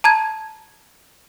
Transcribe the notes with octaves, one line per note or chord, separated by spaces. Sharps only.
A5 A#5 G#6